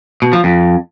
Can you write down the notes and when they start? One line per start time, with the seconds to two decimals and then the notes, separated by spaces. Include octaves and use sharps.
0.22 B2
0.33 F3
0.44 F2